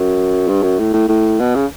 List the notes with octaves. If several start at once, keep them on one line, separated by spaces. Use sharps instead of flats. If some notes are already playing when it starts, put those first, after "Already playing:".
Already playing: F#2
G2
F#2
A2
A2
A2
B2
C#3